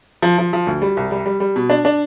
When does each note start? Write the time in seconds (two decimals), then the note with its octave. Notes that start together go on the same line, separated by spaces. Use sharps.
0.22 F3
0.38 F3
0.53 F3
0.67 D2
0.82 G3
0.97 C2
1.11 G3
1.26 G3
1.40 G3
1.56 B2
1.70 D4
1.85 D4